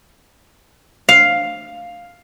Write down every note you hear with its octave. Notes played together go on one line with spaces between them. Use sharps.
F5